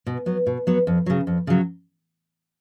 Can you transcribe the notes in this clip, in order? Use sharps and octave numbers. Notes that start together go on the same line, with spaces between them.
B2
F#3 B3
B2
F#3 B3
F2
C#3 F#3
F2
C#3 F#3